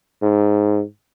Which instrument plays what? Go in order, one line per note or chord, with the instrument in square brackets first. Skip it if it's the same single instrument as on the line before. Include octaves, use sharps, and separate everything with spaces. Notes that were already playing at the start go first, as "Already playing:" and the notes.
[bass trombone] G#2